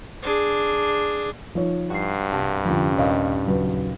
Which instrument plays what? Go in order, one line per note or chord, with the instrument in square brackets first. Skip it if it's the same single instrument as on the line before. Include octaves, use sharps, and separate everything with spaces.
[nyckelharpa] D4 G#4
[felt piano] F3 D#4 C#5
[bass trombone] G2 [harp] F#4 C7
[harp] C2 [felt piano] A5
[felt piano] F2 D3 [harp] G3 A#3 C#4
[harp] D#2 A#2 [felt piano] C#5 D#5 F5
[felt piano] C#3 F#3 B4